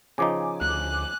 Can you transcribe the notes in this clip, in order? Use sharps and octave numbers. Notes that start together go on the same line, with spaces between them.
C#3 F3 D#4 G#5 D6
D2 F#6